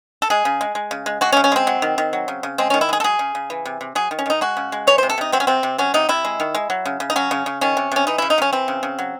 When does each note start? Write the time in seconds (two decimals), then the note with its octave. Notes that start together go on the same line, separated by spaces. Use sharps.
0.22 A4
0.30 G#3 G#4
0.45 C#3
0.61 G#3
0.75 G#3
0.91 C#3
1.06 G#3
1.21 G#3 F#4
1.32 C#4
1.37 C#3
1.44 C#4
1.52 G#3 C4
1.67 F#3
1.82 D#3
1.98 D#3
2.13 F#3
2.28 C#3
2.43 C#3
2.58 G#3 C4
2.70 D#3 C#4
2.81 E4
2.89 G#3 G#4
3.00 A4
3.04 F#3 G#4
3.19 C#3
3.35 C#3
3.50 E3
3.65 C3
3.81 C3
3.95 F#3 G#4
4.11 D#3
4.19 C#4
4.26 D#3 D#4
4.41 G#3 F#4
4.57 C#3
4.72 G#3
4.87 E3 C#5
4.98 C3 C5
5.09 A4
5.18 C3 D#4
5.32 F#3 C4
5.40 C#4
5.47 C3 C4
5.63 C3
5.78 F#3 C#4
5.94 C3 D#4
6.09 C3 E4
6.25 G#3
6.40 D#3
6.55 G#3
6.70 F#3
6.85 C#3
7.00 C#3
7.10 D#4
7.16 F#3 C#4
7.31 C#3
7.46 C#3
7.61 D#3 C#4
7.77 C3
7.92 C3 C#4
8.07 E3 D#4
8.18 C#3 E4
8.30 D#4
8.38 C#3 C#4
8.53 E3 C4
8.68 C#3
8.83 C#3
8.99 F#3